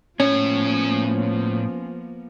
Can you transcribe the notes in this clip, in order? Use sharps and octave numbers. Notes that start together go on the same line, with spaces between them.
A2 F3 A#3 B3 C#4